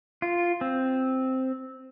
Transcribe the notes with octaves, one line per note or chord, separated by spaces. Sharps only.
F4
C4